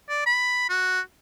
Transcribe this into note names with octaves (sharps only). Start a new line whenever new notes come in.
D5
B5
F#4